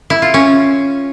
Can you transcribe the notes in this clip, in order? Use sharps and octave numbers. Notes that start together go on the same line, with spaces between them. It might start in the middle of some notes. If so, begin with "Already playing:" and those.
E4
F4
C#4